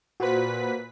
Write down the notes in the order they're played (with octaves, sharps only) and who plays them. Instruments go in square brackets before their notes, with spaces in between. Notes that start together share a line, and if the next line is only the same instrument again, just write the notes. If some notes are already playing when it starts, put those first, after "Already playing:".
[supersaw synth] A#2 B4 B6 [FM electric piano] F#4 C5